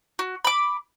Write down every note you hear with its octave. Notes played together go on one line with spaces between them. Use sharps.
F#4
B5 D6